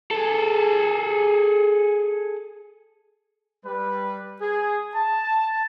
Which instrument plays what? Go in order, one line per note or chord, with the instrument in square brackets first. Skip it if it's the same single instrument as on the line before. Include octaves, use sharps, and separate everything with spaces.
[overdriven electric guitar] G#4 A4
[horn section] G3 B4
G#4
A5